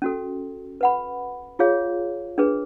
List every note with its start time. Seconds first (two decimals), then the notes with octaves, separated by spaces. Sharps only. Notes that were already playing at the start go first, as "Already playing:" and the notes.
0.02 C#4 F#4 A4
0.81 B4 F#5 B5
1.59 F4 G#4 C#5 F5
2.38 D4 G#4 B4